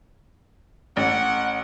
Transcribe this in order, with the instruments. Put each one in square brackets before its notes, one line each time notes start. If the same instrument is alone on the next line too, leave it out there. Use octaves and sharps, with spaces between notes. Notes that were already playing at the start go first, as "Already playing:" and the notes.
[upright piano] A1 [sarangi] F#5